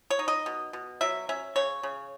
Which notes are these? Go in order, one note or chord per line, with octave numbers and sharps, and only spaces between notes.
C#5
D#4
D#5
B2
B2
F#3 E5
C#4 E5
C#3 C#5
C#3